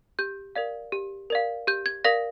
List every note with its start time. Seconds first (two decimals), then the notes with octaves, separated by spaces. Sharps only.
0.19 G4 G6
0.56 A#4 D5 F5
0.92 G4
1.30 A#4 D5 F5
1.67 G4 G6
1.86 G#6
2.04 A#4 D5 F5 A#6